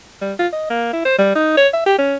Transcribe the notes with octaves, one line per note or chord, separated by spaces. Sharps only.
G3
F4
D#5
A#3
E4
C5
G3
D#4
C#5
E5
G4
C#4